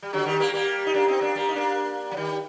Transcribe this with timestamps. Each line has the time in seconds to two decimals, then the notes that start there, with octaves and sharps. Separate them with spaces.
0.03 G3
0.13 D3 F#3
0.26 D#3 G3
0.40 G3 A#3
0.54 G3 A#3
0.86 D#4
0.94 A#3 D4
1.07 C4 D#4
1.21 A#3 D4
1.35 G3 A#3
1.49 D#4
1.55 A#3 D4
2.11 F#3
2.17 D#3 G3